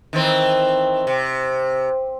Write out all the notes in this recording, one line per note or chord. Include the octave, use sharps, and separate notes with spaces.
D#3 E3 C4
C3